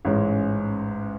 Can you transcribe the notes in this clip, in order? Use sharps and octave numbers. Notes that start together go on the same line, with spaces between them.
A1 G#2 G#3 C#4